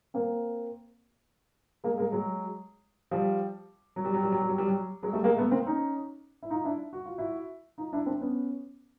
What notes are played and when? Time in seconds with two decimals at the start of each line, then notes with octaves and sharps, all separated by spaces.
0.14 A#3 C4
1.84 G#3 A#3
1.98 G#3 A#3
2.12 F#3 G#3
3.11 F3 G3
3.96 F#3
4.05 G3
4.14 F#3
4.23 G3
4.32 F#3
4.41 G3
4.49 F#3
4.58 G3
4.67 F#3
5.03 F#3 G#3
5.13 G3 A3
5.24 G#3 A#3
5.37 A3 B3
5.51 A#3 C4
5.66 C#4 D#4
6.43 E4
6.50 D#4 F4
6.65 D4 E4
6.93 F#4
7.06 F4
7.18 E4 F#4
7.78 D#4 F4
7.93 D4 E4
8.06 C4 D4
8.21 B3 C#4